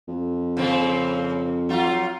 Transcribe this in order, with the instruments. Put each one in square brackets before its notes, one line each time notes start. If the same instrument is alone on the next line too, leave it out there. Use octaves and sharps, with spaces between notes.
[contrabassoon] F2
[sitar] C#3 A#3 C4
F#3 F4